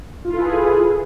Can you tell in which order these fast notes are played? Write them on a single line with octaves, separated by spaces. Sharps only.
F4 E4 A4 B4 G#4